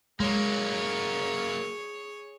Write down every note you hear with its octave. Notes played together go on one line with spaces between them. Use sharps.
F#3 G#3 A#3 G#4 C#5